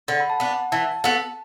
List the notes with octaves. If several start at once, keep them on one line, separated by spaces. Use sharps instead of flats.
D3 F#5
B5
A5
B3 D4
F#5
E3 A5
B3 F#4 A4